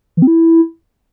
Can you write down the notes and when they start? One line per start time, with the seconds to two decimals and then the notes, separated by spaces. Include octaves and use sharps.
0.17 E3
0.22 C4
0.27 E4